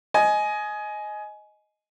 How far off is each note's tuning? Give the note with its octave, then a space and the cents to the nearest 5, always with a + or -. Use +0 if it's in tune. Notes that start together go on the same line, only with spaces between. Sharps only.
D#5 +0 G#5 +20